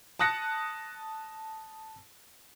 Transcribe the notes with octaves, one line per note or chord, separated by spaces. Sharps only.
A5 D#6 F#6 A#6 C#7